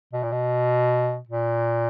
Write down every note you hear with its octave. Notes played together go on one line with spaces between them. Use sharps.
B2
A#2
B2
A#2